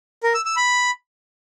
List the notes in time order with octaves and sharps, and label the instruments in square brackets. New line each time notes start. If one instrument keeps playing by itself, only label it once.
[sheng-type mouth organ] A#4
E6
E6
B5